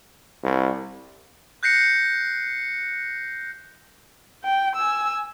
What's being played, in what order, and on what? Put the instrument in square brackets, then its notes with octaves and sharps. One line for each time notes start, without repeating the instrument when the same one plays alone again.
[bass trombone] C2
[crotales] F#6 G6 A#6 C7 C#7
[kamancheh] G5
G#5 E6